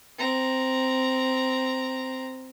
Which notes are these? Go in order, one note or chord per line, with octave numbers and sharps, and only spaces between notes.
C4 A#5